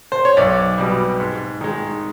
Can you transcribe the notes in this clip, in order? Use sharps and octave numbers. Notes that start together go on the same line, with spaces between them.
C5
C#5
B1 D5
B2 G3
G#2
D#3 G#3